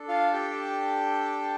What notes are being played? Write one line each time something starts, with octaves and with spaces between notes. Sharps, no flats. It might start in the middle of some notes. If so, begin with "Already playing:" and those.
Already playing: D4 A4
F4 F5
G4 G5